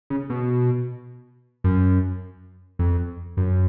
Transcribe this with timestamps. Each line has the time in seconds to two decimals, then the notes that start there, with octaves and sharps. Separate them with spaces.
0.10 C#3
0.30 B2
1.64 F#2
2.79 F2
3.37 F#2